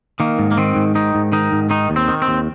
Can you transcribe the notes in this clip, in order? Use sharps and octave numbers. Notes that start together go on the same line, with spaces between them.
D#3 A#3
G#2
A#3
D#3 C4
G#2
D#3 D#4
G#2
D#3 D#4
G#2
D#3 D#4
D#2
C4
D#3
C4
D#2